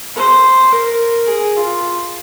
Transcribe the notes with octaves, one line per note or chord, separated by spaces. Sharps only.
C5
A#4
G#4
F4